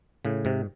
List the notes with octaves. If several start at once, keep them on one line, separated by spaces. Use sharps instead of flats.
A2 C#3
G#2 C3